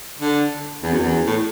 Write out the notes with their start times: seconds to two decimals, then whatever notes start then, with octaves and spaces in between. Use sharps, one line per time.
0.21 D3
0.83 E2
0.93 F#2
1.02 E2
1.26 A2